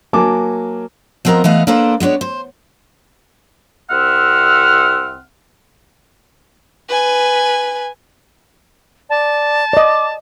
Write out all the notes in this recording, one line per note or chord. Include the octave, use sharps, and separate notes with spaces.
F#3 A#3 G#5 A5 D6
F3 B3 C4 A#4 D#5 A#5
E3 A3 B3 B4 D#5 F5
A#3 D4 A4 B4 C5 D5
G#3 B3 D4 C#5
C5
C2 C4 E5 F#5 F6
B4 G#5
D5 A5
D5 D#5 D6